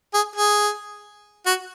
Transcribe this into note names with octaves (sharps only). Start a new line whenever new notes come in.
G#4
G#4
F#4